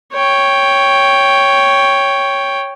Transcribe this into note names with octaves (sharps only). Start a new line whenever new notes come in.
C#5 G5